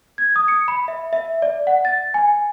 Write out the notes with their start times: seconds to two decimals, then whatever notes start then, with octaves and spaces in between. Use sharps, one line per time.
0.18 G#6
0.36 D#6
0.48 C#7
0.68 B5
0.88 E5
1.13 E5
1.42 D5
1.67 F#5
1.85 A6
2.14 G#5